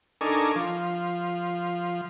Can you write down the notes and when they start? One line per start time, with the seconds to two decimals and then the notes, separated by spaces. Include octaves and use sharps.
0.21 D4 D#4 A4 A#4 G#5 C#6
0.56 F3